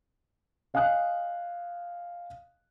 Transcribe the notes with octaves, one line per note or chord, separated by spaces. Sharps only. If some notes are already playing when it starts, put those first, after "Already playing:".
D#5 F5 G#5 D#6 F#6